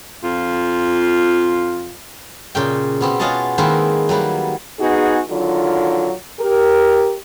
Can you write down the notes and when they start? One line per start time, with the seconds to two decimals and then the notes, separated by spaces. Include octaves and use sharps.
0.24 F2 F4
2.55 A#2 C#3 G5
3.01 B2 B3 C4
3.19 F4 G#4 C#5 D#5 F#5 A5
3.58 D#3 G#3 A#3 C4 E4 B4
4.09 F#3 G3 A#3 B4
4.80 B3 D#4 F#4 G#4
5.29 D3 D#3 F#3 F4
6.39 G4 A#4